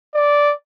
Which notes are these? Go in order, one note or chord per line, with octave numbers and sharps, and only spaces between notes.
D5